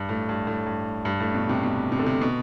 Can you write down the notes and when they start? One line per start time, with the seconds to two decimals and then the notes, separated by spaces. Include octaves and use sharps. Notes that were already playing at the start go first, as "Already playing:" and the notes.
Already playing: G2
0.09 A2
0.29 G2
0.47 A2
0.66 G2
1.05 G2
1.20 A2
1.35 B2
1.49 C3
1.63 B2
1.92 C3
1.99 D3
2.06 C3
2.21 B2